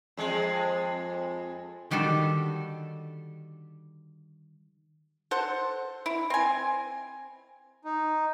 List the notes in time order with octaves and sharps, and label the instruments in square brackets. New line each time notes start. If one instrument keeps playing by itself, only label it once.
[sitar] F2 G#3
[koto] D3 D#3 G3 F#4 A4
[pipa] A4 C5 F#5
E4
C4 G#5
[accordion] D#4